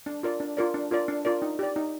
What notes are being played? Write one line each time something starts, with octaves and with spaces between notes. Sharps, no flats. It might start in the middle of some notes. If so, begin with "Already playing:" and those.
D4
F4 A#4 D5
D4
F4 A#4 D5
D4
F4 A#4 D5
D4
F4 A#4 D5
D#4
G4 D5
D#4